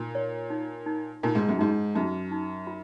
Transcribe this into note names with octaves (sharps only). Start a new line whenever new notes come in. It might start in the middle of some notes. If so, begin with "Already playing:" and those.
Already playing: A#2 D#4
C#5
D#4
D#4
A#2 D#4
G#2
F#2
G#2 D#4
F#2 D#4
D#4
F4